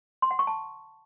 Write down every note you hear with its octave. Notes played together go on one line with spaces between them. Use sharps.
C6
F#5
C#6
A5